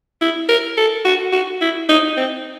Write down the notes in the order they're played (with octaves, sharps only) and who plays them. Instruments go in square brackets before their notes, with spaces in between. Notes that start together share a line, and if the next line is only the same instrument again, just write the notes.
[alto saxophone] E4
A#4
A4
F#4
F#4
E4
D#4
C4